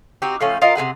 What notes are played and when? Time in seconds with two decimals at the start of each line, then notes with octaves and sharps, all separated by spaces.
0.22 C4 D#4 F#4 G4
0.40 A2 F3 C#4
0.62 F4 A#4 D#5
0.75 C3 G3 G#4 F#5